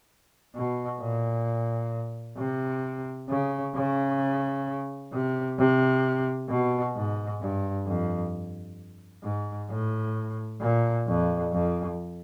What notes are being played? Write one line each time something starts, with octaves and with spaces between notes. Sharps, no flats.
B2
A#2
C3
C#3
C#3
C3
C3
B2
G#2
G2
F2
G#2
A2
A#2
F2
F2